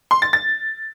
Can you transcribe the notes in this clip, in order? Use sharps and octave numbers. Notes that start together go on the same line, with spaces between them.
C6
A6
A6